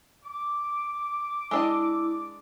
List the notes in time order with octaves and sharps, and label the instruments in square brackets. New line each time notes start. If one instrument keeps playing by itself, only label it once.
[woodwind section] D6
[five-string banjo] G#3 D4 D#5 [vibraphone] E4